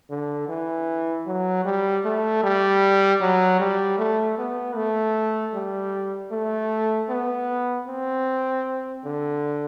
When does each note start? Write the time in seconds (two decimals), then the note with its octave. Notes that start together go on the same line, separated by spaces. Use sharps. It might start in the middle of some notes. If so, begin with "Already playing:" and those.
0.10 D3
0.48 E3
1.26 F#3
1.65 G3
2.05 A3
2.43 G3
3.21 F#3
3.59 G3
3.99 A3
4.38 B3
4.76 A3
5.54 G3
6.32 A3
7.09 B3
7.87 C4
9.05 D3